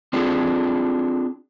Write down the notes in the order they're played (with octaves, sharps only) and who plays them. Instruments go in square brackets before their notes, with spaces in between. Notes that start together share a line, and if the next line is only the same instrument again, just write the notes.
[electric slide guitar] C4 D4 F4 G#4 A4